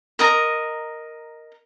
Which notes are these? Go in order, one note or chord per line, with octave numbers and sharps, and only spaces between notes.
A#4 D#5 A#5